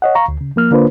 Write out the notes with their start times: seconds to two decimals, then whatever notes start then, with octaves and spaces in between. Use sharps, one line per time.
0.02 C#5 D#5 F#5
0.15 F5 A#5 C#6
0.28 D2
0.41 C#3
0.56 F3 A#3 F6
0.71 D3 A#3 D4 F4 B4 C5